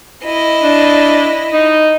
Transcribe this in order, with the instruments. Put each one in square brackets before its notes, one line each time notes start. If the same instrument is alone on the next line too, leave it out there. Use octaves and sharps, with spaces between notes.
[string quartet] E4 D#5
[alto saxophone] D4
D#4